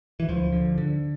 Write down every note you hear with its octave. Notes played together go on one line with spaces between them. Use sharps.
E3
D2 F3
D3
D3